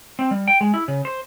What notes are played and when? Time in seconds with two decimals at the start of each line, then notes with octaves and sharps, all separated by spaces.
0.19 C4
0.31 G3
0.48 G5
0.61 G#3
0.74 E4
0.88 C#3
1.05 C5